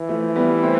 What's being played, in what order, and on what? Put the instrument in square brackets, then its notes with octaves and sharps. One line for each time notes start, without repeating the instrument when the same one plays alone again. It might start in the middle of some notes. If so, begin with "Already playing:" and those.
Already playing: [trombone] E3
[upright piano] F3 A3
G3 B3
A3 C4